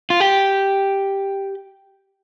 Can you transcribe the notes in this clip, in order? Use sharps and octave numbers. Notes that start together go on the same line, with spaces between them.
F4
G4